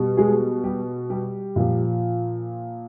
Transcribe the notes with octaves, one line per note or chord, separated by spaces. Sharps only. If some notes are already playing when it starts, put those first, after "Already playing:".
Already playing: B2 G3
G#3 G#4
G3 G4
G3 G4
A#2 F3